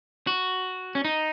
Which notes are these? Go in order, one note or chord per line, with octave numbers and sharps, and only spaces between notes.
F#4
C#4
D#4